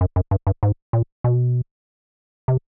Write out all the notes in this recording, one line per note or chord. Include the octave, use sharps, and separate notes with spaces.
F#2
F#2
G2
G2
G#2
A#2
B2
C3